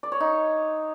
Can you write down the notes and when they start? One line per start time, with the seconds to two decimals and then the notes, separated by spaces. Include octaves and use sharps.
0.03 D5
0.12 C#5
0.20 D#4